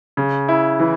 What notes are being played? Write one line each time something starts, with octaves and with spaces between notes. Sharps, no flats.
C#3
E4
E3